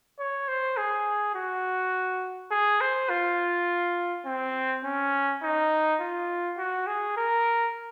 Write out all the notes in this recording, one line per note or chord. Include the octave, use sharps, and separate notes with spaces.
C#5
C5
G#4
F#4
G#4
C5
F4
C4
C#4
D#4
F4
F#4
G#4
A#4